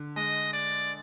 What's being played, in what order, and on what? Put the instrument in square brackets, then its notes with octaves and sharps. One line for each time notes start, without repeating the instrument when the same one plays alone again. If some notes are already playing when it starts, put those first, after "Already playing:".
Already playing: [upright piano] D3
[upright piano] G#3 [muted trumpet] D#5
[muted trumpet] D5